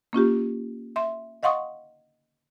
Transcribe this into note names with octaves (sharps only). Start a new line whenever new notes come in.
A#3 C#4 F4 G4
E5 C6
D#5 F5 F#5 C6 C#6 D#6